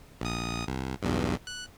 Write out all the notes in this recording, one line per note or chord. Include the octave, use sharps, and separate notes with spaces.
A#1 D#6
C2
B1 E2 G2
F#6